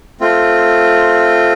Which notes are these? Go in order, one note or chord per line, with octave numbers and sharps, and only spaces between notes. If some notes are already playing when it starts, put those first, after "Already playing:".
A3 C4 F4